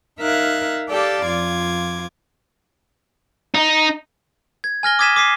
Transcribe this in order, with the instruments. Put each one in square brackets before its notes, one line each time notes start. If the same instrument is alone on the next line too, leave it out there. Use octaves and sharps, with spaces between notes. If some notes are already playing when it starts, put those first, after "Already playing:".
[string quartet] D#4 A#4 E5 F5 F#6 G#6
G4 A4 D5 F5 G5 A5
F2 F4 D6 G#6
[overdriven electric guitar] D#4
[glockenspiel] G#6
G#5 F6 A#6 G7
D6 D#6 G#6 B6 D#7 E7
D6 B6 C7 D#7